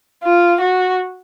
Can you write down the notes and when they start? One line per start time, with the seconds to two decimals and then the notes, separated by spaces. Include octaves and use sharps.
0.24 F4
0.61 F#4